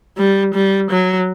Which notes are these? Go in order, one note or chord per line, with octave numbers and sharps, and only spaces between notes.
G3
G3
F#3